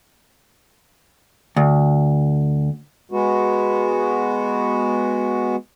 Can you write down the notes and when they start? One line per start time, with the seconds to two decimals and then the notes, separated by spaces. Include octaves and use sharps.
1.56 D2
3.11 G#3 B3 F#4